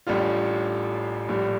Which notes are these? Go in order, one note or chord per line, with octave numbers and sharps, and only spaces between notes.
A1 A2 G3 D4 F4
A#1 A2 G3